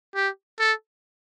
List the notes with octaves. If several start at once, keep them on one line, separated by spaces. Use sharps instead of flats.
G4
A4